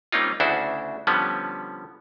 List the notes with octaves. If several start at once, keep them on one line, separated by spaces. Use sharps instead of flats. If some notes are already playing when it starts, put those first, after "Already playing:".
G3 A#3 C4 C#4 D#4 F4
D2 C#3 D4 E4 F#4 C5
D3 F3 G3 B3 C#4